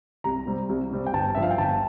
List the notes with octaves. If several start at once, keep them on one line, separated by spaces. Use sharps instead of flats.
C2 A#5
C3 G3 C4
C2
C3 G3 C4
G5
G1 A5
G2 F3 E5
F5
G5
G1 A5